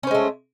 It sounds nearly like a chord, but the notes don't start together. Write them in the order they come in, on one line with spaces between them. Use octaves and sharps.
C#4 C5 G#3 A3